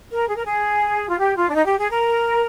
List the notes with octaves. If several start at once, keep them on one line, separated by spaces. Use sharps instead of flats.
A#4
G#4
A#4
G#4
F4
G4
F4
D4
D#4
G4
G#4
A#4